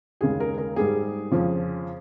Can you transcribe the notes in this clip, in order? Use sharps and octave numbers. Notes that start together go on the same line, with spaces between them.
D#2 C#3 G#3 G#4
A#4
A#4
G#2 G3 G#4
F2 C#3 F3